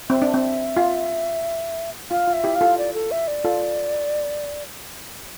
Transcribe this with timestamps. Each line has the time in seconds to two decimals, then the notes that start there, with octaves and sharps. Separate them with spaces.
0.09 C4 E5
0.22 D4
0.34 C4
0.77 F4
2.11 F4 F5
2.27 F4
2.33 E5
2.44 E4 G4
2.55 F5
2.61 F4 A4
2.78 D5
2.94 A4
3.11 E5
3.28 D5
3.45 F4 A4